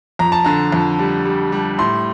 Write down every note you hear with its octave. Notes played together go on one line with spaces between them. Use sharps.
F2 A#5
A5
D3 A#5
F2
G3
G3
G3
A2 C6